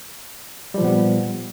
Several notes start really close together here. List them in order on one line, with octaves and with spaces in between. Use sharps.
G3 F3 A#2 B3